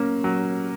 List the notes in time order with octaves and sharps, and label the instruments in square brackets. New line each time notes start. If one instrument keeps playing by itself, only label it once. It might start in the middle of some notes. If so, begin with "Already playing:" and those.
Already playing: [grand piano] F#3 A#3 [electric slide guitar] C#4
[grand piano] F#3